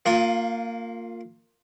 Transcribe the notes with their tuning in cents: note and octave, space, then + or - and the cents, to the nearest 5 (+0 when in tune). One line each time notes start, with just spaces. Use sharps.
A#3 -20 F4 +15